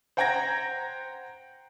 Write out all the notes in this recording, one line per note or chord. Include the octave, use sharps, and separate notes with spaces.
C5 F#5 G5 A#5 G#6 A#6